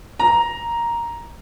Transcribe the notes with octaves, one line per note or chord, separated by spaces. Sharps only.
A#5